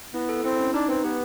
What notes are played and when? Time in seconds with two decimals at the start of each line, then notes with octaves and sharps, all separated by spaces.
0.14 B3 E4
0.29 A4
0.44 C4 E4
0.59 C#4
0.74 D4 D#4
0.88 C4 B4
1.04 B3 G4